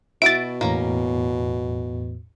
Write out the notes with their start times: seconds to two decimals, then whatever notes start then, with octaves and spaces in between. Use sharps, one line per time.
0.22 B2 E4 F#4 E5 A6 D7
0.61 E2 A2 A#3 C#4 A#5